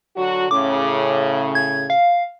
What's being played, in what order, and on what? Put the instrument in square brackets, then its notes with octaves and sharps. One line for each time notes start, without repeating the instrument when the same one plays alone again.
[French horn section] D3 F#3 F#4
[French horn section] A2 C#3 [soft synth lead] D6
[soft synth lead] G#6
F5